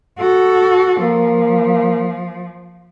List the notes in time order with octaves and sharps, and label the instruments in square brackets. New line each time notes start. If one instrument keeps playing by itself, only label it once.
[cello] F#4 A4
[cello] F3 [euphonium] A#3